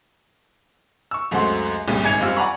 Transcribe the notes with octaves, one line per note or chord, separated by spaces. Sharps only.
C#6 E6
C#2 F#2 A3 C4 F#4 C6
G1 C2 A#2 C#3
G#1 D#4 G#5 G#6 C#7 F7
F#1 G3 C4 F4 E6 F6
D5 F#5 G#5 A#5 B5 C#6